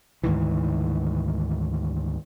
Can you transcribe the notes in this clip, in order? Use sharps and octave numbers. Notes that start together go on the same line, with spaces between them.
D2 G#2 D#3 E3